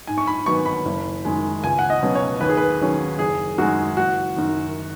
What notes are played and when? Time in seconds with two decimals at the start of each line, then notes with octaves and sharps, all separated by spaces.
0.07 G#2 G#5
0.18 C#6
0.27 B5
0.46 D#3 F#3 B3 C#6
0.66 B5
0.85 F#1
1.25 F#2 D#3 G#3
1.64 C#2 G#5
1.79 F#5
1.90 D#5
2.03 B2 F#3 C#4
2.15 C#5
2.41 D#2 B4
2.49 G#4
2.57 B4
2.80 D#3 F#3 C#4
3.19 F#1 G#4
3.58 F#2 D#3 G#3 F#4
3.97 F#1 F#4
4.36 F#2 D#3